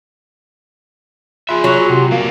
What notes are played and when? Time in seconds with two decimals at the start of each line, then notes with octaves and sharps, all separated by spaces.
1.49 F4 G#4 E5 B5 C6 F#6
1.64 F#3
1.90 C3 F#4 G4 C6
2.12 G3 A#3 F5